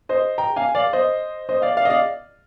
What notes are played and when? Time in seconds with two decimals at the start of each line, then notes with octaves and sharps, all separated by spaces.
0.09 C5 D#5
0.38 G5 A#5
0.56 F5 G#5
0.75 D5 F5
0.93 C5 D#5
1.49 C5 D#5
1.62 D5 F5
1.77 D5 F5
1.85 D#5
1.90 D5 F5